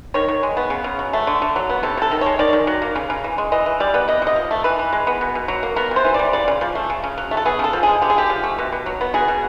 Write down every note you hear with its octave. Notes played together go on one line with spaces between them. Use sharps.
D#3 C#5
D#3
G#3
B3
C#3
C#3
F#3
A3
D3
D3
F#3
B3
C3 A4
C3 A4
D#3
G#3 C#5
D#3 D5
D#3
F#3
A#3
C#3
C#3
E3
G#3
E3 D#5
E3
G3 D5
B3
C3 D#5
C3 D#5
F3
A3
E3 B4
E3
G#3
B3
B2
B2
F#3
A#3
B3 A#4
C3 C5
E3
G3 D5
C#3 D5
C#3
F3
A3
C#3
C#3
F#3
A3
A4
B3 G#4
C#3 A4
F3
G#4
G#3
D3 G4
G#4
D3 G4
F3
A3
B2
B2
F#3
B3
B2 G#4
B2